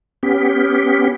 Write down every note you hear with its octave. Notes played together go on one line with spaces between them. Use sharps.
B3 C#4 G4